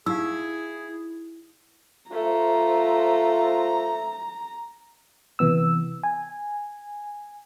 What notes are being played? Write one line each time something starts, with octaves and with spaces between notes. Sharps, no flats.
D#4 E4 G4 G#4 F5 E6
A3 F4 C5 A#5
C3 E3 B3 E6
G#5